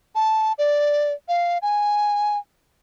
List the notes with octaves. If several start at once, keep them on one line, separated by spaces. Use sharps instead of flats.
A5
D5
F5
G#5